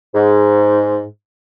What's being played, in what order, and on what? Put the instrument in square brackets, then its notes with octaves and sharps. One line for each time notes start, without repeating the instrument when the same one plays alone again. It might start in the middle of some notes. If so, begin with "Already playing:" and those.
[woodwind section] G#2